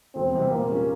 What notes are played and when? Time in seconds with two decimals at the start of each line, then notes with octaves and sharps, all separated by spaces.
0.15 E1 C4
0.34 E2 C3 G3
0.52 A#2 A#3
0.70 G3 C#4 F4 G#4